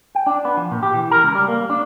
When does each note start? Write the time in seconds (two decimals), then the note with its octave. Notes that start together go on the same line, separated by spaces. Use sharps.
0.15 G5
0.27 D4
0.45 B3
0.57 F3
0.71 A#2
0.83 G4
0.94 E3
1.11 A#4
1.23 C#2
1.35 G3
1.48 A#3
1.70 D4